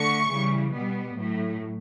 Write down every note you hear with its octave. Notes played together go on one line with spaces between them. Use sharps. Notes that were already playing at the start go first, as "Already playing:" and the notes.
Already playing: D3 A3 C#6
C#3 E3 G3
B2 G3 B3
A2 F#3 A3